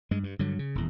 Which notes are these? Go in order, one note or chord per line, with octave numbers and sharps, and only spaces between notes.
G2 G#3
G2
G2 D3 F#3
C#3
D#1 E2